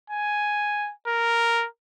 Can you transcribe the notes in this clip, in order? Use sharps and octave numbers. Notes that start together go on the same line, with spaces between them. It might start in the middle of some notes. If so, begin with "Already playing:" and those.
G#5
A#4